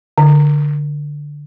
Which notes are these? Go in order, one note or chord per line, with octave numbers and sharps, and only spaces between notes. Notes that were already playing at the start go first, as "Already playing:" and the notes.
D3